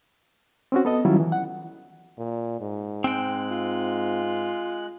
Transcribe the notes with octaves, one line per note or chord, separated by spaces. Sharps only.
C4 C#4 F#4
B3 A4 D#5
D#3 F#3 G3 C#4 E4 F4
E3
F#5
A#2
G#2
G#3 C4 G5 F#6
F4